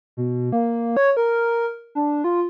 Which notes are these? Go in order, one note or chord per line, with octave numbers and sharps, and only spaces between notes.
B2
A#3
C#5
A#4
D4
F4